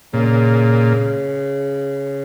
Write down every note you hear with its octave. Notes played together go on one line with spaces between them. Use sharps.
A#2 C#3